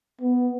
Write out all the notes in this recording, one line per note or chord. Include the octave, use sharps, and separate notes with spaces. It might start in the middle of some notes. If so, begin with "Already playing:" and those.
B3